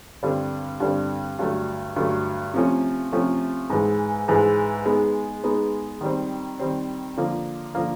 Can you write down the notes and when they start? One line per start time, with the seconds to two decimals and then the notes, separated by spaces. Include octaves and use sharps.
0.23 G2 D3 G3 C4
0.80 G2 D3 G3 C4
1.39 G2 D3 F#3 A3
1.96 G2 D3 F#3 A3
2.54 C3 F3 A3 C#4
3.12 C3 F3 A3 C#4
3.70 G#2 E3 G#3
4.28 G#2 E3 G#3
4.85 G#3 B3 D#4
5.44 G#3 B3 D#4
6.01 D#3 G3 C4
6.59 D#3 G3 C4
7.17 D3 F3 A#3
7.75 D3 F3 A#3